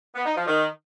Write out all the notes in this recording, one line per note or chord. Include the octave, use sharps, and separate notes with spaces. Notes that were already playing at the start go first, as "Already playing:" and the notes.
B3
D#4
F3
D#3